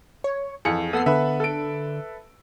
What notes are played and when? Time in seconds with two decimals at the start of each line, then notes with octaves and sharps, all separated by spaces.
0.24 C#5
0.65 F2 E3 G#4 C#7
0.93 B3 A4 D#6 E6 C7
1.06 D3 B4 E5
1.40 A4 D7